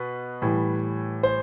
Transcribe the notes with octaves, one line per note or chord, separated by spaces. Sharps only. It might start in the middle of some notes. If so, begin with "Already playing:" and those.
Already playing: B2 B4
A2 E3 G3
C5